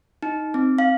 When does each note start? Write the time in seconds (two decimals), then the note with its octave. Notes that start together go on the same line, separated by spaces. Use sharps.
0.22 D#4
0.54 C4
0.78 F5